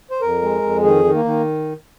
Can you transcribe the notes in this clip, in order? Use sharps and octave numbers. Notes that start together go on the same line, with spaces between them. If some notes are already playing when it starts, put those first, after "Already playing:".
C5
F2 A#4
G#3
F2
D#3 G#4
D#3
A#3
D#3